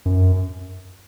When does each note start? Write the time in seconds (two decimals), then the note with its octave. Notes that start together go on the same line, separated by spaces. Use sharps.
0.06 F#2